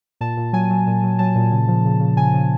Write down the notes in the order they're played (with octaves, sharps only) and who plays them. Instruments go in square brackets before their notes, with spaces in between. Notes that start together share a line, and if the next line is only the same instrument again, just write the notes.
[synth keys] A#2 A5
A#2
F#3 G#5
F#3
A#2
F#3
F#3 A5
A#2
C#3
F3
C#3
C#3
C#3 G#5
C#3